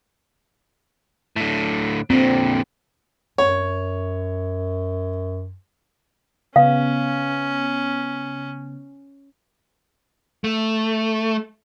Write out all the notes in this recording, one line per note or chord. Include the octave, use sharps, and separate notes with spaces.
A2 D3
A#2 D3 C4
F#2 C#5
C#3 B3 C#4 F5
A3